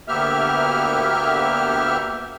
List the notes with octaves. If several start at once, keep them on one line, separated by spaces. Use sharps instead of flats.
D2 A#3 B3 G4 E5 F6